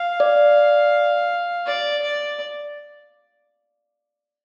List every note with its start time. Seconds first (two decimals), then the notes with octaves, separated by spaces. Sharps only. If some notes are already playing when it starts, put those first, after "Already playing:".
Already playing: F5
0.20 D5
1.66 D5
2.03 D5